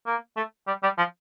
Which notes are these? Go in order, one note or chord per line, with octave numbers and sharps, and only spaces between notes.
A#3
A3
G3
G3
F3